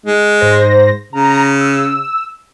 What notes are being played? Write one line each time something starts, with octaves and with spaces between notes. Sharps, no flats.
G#3
G#2 C5 A#6
C#3 A#5
E6